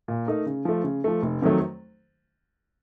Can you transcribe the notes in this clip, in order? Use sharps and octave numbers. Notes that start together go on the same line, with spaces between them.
A#2
A3 D#4 A#4
C#3
F3 A3
C#3
F3 A3
F1
F2 D#3 F#3 A3